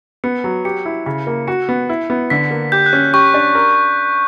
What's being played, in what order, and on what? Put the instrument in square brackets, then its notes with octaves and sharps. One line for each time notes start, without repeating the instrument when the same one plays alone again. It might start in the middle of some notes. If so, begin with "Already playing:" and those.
[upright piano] B3 [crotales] C#7
[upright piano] F#3
[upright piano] G4 [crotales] C#7
[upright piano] E4
C#3
A#3
[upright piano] F#4 [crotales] C#7
[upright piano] B3
E4
B3
[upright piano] D3 [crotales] B6
[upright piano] A#3
[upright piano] G4 [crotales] G6
[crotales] F#6
[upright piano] C#4
[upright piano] G4 [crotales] C#6
[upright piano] D4
A#4